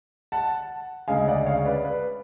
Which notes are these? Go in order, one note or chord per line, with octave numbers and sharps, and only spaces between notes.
F#5 A5
D2 C#3 G#3 F5 G#5
D5 F#5
C#5 F5
B4 D5
B4